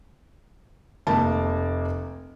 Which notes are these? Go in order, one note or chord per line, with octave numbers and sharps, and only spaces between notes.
F1 A#3 A5